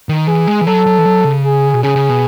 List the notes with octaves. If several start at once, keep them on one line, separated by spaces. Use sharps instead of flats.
D#3
E3 G#4
G#3
E3
F#3 A4
F#3
E3
F#3
C#3
G#4
B2
C#3 G#4
C#3
B2